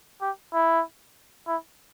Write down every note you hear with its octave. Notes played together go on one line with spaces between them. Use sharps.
G4
E4
E4